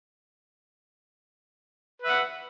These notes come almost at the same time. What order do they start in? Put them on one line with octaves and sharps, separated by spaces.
B4 E5 F#5